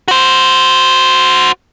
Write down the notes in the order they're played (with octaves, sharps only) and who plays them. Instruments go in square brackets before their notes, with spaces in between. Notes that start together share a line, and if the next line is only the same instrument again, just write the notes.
[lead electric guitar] F#4 C5